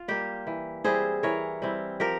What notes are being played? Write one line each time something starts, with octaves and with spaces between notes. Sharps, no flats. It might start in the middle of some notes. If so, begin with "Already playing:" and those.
Already playing: F4
G3 A#3 G4
E3
G3 C4 E4 G#4 C5
E3 A#4 C#5
G3 C4 E4
F3 G4 A#4